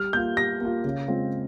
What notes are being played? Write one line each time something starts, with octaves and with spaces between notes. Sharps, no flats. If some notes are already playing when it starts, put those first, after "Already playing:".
Already playing: G3 F6
A#3 F4 G6
G3 A#6
A#3 F4
C#3
G#3 C4 F4